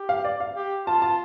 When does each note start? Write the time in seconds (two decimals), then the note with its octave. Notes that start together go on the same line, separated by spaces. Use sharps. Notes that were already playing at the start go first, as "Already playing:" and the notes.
Already playing: G4
0.09 F5
0.24 D5
0.40 F5
0.56 G4
0.87 F4 A5
1.02 A5